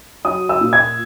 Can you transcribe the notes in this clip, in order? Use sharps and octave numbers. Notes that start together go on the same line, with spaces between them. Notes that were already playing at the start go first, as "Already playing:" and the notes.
F#3 D#6
E6
A#2
G#6